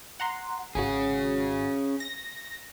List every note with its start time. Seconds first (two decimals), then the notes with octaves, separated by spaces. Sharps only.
0.20 F#5 A#5 C6
0.75 G#1 C#4 F#4 G#4
2.00 A#6